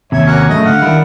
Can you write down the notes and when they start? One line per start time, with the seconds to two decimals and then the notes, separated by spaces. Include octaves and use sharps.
0.12 D#2 C3 C#5 E5
0.26 A#3 C#4 F#4
0.49 A2 C#3 F#3 A3 D#5
0.65 D3 F5 F#5
0.82 D#3 G3 D4 E4